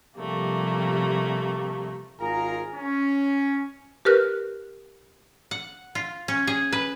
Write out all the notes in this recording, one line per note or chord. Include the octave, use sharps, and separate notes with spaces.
C3 F3 G3 A3 A#3
G#1 F4 G#4 A#4 A#5
C#4
G4 A#4 B4 F6 F#6
F#5
F4
C#4
G#4
B4